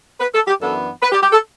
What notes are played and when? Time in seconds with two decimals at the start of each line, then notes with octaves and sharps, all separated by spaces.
0.20 B4
0.35 A4
0.48 G4
0.61 F#2 E3 B3 D4 A4
1.03 B4
1.12 G4
1.23 G4
1.33 A4